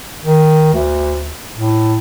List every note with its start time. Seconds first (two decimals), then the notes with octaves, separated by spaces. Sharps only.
0.23 D#3
0.73 D2
1.56 A2